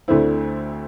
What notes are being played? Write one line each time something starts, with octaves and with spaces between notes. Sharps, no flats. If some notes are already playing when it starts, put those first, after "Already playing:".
D2 D3 A3 C4 E4